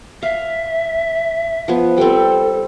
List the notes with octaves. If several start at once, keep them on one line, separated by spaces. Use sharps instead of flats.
E5 F5
F3 B3
G3 C4 A4